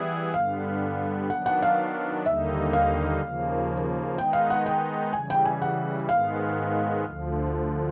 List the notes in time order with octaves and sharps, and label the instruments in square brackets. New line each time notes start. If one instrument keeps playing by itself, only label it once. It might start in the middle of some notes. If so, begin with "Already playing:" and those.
Already playing: [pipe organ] E3 G3 B3 E4 G#4
[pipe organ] G2 D3 G3 B3 [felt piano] F5
[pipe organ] D#3 F#3 B3 D4 [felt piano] F#5
[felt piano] F#5
F5
[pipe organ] D#2 D3 G3 A#3 D#4 [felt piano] E5
[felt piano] F5
[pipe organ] D#2 C#3 F3 A#3
[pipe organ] D#3 G#3 B3 D#4 [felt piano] G5
[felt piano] F5
F#5
G5
[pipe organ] C#3 E3 G3 [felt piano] G#5
[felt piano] G5
G#5
F#5
[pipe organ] G#2 D#3 G#3 B3 [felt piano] F5
[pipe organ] D2 D3 F3